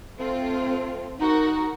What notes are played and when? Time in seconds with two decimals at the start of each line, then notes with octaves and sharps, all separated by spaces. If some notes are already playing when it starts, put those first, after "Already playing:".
0.16 A3 C4 F4
1.20 D#4 F#4 A#4 F#5